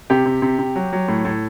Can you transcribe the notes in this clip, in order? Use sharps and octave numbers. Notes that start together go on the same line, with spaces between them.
C3 G4
C3
C3
C3
F#3
F#3
A2
A2